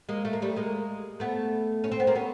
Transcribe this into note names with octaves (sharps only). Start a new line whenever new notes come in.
G#3 A#3
A3
A#3
G3 A3
G#3 A#3
A3 B3
C#4
C4
B3
A#3 C4
B3 C#4